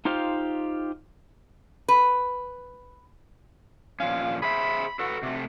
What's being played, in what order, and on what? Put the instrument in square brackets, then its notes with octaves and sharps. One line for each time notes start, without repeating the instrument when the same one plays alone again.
[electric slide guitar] D#4 F4 G4 C5 F5
[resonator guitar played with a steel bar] B4
[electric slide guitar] A#2 F3 C#4 [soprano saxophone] F5
[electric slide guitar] G#4 C5 E5 [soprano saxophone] B5
[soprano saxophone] F#4 [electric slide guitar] A4 B4
[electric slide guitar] C3 A3